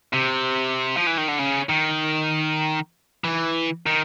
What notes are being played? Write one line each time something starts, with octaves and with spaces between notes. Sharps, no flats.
C3
F3
E3
D#3
D3
C#3
D#3
E3
D#3